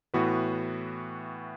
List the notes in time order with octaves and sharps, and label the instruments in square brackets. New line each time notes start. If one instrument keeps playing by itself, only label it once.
[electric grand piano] A2 E3 B3 F#4 B4